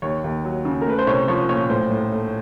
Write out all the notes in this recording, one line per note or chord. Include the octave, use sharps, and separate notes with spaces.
D#2 C#5
D#2
F#3
C#3
A#4
A3 B4
C5
C2 C#5
F3 C#5
A#2 C#5
A2 C5
A2
A3